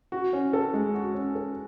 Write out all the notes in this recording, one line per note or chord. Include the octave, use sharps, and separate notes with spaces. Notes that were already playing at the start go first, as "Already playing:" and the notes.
F#4
C#4
A4
G#3
F#4
C#4
A4